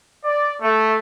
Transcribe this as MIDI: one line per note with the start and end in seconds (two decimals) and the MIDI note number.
0.24 0.53 74
0.62 0.96 57